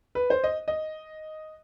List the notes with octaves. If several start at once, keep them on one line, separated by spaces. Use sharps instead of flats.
B4
C5
D#5
D#5